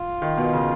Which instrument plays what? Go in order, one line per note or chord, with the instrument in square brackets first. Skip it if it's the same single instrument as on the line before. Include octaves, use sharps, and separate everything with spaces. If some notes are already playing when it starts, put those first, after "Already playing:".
Already playing: [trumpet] F4
[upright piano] D#3
B2
C#3